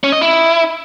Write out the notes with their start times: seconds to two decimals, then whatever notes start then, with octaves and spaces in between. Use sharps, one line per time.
0.04 C#4
0.12 D#5
0.21 E4